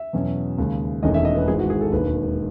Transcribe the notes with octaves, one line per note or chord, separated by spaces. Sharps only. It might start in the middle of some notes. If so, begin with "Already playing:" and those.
Already playing: E5
E2 B2 F#3 C#4
D#2 C#3 G#3
E1 E2 D#3 A3 C#4 D#5
E5
D#5
B4
G#1 G#2 E3 G#4
F#4
G#4
A4
E1 D#2 D#3 B4